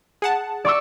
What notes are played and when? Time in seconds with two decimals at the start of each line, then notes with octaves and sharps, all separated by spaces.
0.22 G#4 F#5 A5
0.65 D5 C#6 E6